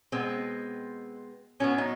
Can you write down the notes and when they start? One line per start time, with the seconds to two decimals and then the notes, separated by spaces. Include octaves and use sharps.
0.12 B2 G#3 B3 C4
1.60 A2 F#3 B3 C#4
1.78 D#4